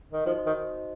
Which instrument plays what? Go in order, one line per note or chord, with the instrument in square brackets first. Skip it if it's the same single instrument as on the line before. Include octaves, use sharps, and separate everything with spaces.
[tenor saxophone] D#3
[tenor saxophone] F3 [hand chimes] D#4 F#4 C5 D#5
[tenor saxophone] D#3